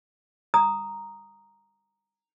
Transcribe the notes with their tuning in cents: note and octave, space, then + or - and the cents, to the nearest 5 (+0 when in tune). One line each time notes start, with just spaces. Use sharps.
A#5 +0 D#6 +0